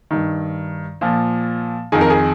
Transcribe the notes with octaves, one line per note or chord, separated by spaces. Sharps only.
G2 D#3
A#2 F3
F2 D#3 G#4
A#4
G#4